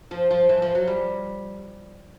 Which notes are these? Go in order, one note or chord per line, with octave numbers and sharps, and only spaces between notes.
F3
F3
E3
F3
F#3
G3